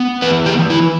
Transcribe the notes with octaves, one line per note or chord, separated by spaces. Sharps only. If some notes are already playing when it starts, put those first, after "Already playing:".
Already playing: B3
E3 B4
G4
E3
E4